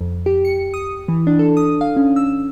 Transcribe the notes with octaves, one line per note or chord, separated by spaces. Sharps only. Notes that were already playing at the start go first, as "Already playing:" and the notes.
F2
G4
C#7
D#6
E3
D4
A4
D#6
F5
C#4
E6